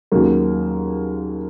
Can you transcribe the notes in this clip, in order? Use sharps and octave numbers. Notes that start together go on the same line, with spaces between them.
D#2 C#3 F#3 A#3